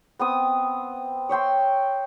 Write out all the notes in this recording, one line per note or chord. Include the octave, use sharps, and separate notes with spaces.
B3 C4 D#6
C#5 E5 G5 C6